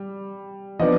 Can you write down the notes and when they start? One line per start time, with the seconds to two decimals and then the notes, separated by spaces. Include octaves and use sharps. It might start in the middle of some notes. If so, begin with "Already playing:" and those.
Already playing: G3
0.79 F3 B3 D4 D#5